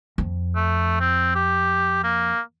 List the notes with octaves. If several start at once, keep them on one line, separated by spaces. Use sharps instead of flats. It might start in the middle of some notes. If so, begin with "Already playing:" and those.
F2
A3
C4
G4
A#3